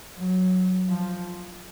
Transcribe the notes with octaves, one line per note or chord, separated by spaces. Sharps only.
F#3
F3